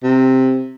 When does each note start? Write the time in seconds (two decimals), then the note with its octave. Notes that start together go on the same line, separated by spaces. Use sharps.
0.04 C3